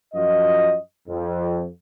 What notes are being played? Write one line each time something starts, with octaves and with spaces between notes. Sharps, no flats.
F#2 F3 F4 F#4 D#5
F2